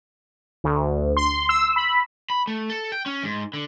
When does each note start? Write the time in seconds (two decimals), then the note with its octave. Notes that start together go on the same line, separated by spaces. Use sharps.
0.64 D2
1.17 C6
1.49 E6
1.76 B5
2.30 B5
2.47 A3
2.70 A4
2.92 G5
3.06 C#4
3.23 G#2
3.54 D3